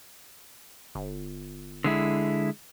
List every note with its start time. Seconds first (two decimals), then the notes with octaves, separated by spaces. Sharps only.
0.95 G1
1.84 D3 G#3 E4